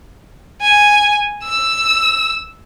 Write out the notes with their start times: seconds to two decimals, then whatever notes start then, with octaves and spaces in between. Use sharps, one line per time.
0.61 G#5
1.43 E6